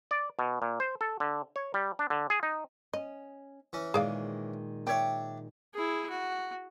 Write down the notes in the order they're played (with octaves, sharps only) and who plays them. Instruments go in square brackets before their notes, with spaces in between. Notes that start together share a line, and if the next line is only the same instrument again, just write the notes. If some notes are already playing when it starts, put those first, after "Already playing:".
[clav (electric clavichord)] D5
B2
A#2
C5
A4
D3
C#5
G3
D4
D3
G#4
D#4
[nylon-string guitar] C#4 [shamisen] D#5
[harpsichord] E3 C#4
[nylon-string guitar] A#2 D#3 G#3 [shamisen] G#4 D5 F5
[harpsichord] D4 E5 [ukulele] C#5 G5
[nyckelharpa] E4 G#4
F#4